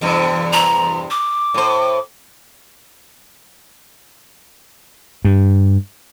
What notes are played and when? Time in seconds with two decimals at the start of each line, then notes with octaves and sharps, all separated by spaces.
0.01 E2 G2 C3
0.53 A#5
1.11 D6
1.54 A2 C5
5.25 G2